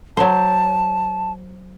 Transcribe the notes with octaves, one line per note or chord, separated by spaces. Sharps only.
F#3 C5 A5